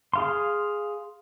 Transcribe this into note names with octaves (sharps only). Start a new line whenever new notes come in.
G#4 F5 C6